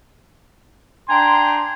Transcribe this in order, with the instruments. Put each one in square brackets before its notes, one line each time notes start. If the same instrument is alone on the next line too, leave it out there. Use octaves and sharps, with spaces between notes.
[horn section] D4 G5 G#5 A#5 C6